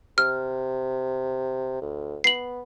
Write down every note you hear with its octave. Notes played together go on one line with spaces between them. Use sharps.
C3 F6
D2
B3 C7 F#7